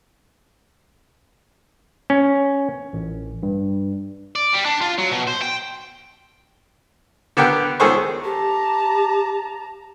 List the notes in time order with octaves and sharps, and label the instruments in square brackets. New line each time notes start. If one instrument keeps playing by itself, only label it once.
[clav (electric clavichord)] C#4
[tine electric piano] A1
G2
[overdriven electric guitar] D5
G3
D4
F4
F#3
B2
C5
G5
[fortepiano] D3 B3 G4 A#4 G5
C#2 D#3 G#4 A4 C5 C#6
[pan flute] G4 [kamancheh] A5 A#5